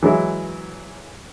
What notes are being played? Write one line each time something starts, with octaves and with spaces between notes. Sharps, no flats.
E3 F#3 G#3 E4